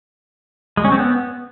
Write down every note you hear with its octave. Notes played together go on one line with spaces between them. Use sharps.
G#3
C#4
C4
B3